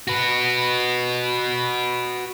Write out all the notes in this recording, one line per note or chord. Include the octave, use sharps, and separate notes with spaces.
F#4 B4